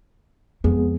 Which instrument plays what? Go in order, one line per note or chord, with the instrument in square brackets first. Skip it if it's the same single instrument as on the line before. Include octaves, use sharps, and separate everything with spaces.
[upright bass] F2 [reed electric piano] G#3 B3 G#4